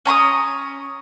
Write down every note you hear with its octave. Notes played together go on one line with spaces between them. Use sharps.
C#4 A#5 C6 D#6